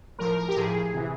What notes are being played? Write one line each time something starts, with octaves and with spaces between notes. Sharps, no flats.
A2 F3 A#4
A#4
G4
A2 F3 G#4
C3 E3